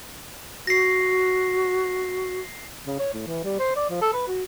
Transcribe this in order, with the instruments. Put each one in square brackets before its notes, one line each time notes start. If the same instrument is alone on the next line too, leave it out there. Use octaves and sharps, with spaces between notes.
[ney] F#4 [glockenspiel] A#6 C7
[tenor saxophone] C#3
C#5
A2
E3
G3
C5
D5
F3
A4
B4
F#4